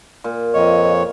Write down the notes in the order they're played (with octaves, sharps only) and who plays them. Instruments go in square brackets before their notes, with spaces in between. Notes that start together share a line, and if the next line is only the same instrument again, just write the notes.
[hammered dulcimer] A#2
[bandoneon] F2 C#5 [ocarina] D#5